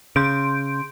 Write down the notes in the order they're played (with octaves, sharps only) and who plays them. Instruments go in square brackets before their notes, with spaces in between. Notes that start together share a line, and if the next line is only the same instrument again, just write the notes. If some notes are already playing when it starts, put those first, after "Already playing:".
[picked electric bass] C#3 [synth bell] C6 G6 D7